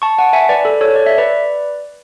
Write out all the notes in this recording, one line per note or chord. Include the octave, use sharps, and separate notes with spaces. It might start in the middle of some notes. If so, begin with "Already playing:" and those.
A5 C#6
F#5 A5
E5 G#5
B4 D5
A4
A4 C#5
D5
E5
B4 D5